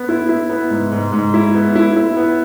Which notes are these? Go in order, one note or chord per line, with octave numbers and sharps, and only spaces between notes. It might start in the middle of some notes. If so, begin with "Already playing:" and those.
Already playing: B3
E4
E4
B3
G#2
G#2
G#2
E4
B3
E4
E4
B3